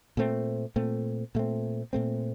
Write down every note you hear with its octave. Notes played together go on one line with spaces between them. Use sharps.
A#2 A3 C4
A#2 A3 C4
A#2 A3 C4
A#2 A3 C4